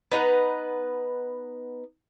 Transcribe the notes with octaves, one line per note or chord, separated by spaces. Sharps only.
B3 D#4 B4 F#5